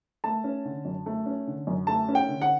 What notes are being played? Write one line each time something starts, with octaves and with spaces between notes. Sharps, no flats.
A3 A5
C#4
D3
F#2
A3
C#4
D3
F#2
A3 A5
C#4
G5
D3
F#5